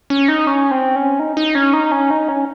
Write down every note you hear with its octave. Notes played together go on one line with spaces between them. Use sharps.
C#4
D#4
C#4
C4
C#4
D#4
D#4
C#4
D#4
C#4
D#4
C#4